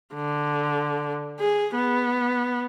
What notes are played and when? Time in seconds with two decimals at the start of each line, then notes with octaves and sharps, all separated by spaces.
0.14 D3
1.40 G#4
1.75 B3